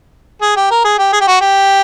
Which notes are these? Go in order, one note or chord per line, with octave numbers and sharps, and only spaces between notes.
G#4
G4
A#4
G#4
G4
G#4
G4
F#4
G4